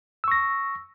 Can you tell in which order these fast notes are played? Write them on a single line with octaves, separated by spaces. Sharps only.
E6 C#6 A#6